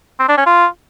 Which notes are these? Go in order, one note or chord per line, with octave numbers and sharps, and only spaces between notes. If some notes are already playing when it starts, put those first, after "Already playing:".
C4
D4
C#4
F4